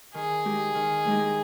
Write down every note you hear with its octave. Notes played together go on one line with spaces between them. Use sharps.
D#3 G#4
G#3 D#4 G4
D#3
G#3 D#4 G4